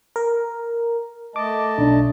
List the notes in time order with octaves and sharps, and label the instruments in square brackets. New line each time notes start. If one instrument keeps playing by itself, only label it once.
[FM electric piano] A#4
[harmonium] A3 D#5 A5 [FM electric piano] D6
[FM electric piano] B1 [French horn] D4